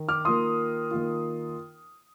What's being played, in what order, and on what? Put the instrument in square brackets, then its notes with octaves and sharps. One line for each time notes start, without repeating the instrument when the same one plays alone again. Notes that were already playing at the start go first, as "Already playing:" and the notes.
Already playing: [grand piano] D#3
D6 F6
D#3 A#3 F4 C6 D#6
D#3 A#3 F4